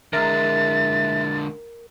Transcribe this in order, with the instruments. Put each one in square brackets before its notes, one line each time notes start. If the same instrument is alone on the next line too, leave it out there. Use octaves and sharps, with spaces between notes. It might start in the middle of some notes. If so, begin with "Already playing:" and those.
[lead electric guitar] D3 G#3 [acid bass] A#4 [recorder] E5 [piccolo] A6